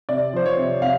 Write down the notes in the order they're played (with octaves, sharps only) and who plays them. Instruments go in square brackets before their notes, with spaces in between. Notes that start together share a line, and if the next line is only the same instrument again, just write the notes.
[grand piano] C3 D5
F3 C5
C#5
C3
C3 F5